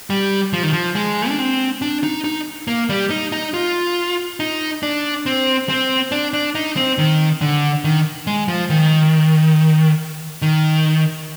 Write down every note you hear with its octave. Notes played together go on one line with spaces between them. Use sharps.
G3
F3
D#3
F3
G#3
D4
C4
D4
D#4
D#4
A#3
G3
D#4
D#4
F4
D#4
D4
C4
C4
D4
D4
D#4
C4
D#3
D3
D#3
G#3
F3
D#3
D#3